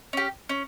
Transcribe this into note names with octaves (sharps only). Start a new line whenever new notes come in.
C#4 G4
C#4